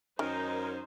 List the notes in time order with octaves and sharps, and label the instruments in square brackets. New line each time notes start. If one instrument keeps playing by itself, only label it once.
[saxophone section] F#2 C#4 [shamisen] D#3 [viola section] D#4 C5 [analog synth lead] A#4